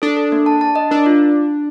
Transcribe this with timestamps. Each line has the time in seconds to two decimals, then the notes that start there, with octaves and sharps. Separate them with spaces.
0.02 D4 A4
0.17 A4
0.32 A#3
0.46 A5
0.61 A5
0.76 D#5
0.91 D4 A#4
1.06 F4